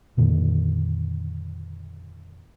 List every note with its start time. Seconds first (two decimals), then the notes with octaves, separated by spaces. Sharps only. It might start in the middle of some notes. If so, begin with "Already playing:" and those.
0.17 F2 A#2 D3 D#3